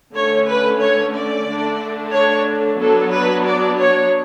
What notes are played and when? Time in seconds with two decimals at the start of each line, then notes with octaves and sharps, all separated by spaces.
0.14 D3 A3 C#4 C#5
0.47 B4
0.80 C#5
1.14 D5
1.47 D3 A3 D4
2.13 C#5
2.80 F#3 B3 D4 A4
3.13 B4
3.46 D5
3.79 C#5